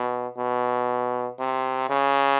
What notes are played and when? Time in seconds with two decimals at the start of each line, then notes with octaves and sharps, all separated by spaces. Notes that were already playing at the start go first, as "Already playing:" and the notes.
Already playing: B2
0.38 B2
1.39 C3
1.90 C#3